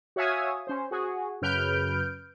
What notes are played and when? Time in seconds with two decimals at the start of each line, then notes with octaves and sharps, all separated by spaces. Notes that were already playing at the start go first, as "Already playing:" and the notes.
0.16 F#4 C#5 E5 F5 G#5 D#6
0.67 C#4 C5
0.91 F#4 G#4
1.42 F#2 C#3 B4 F6 G6 D7